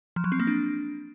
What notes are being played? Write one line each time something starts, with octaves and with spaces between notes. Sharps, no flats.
F3
F#3
C4
A#3
D4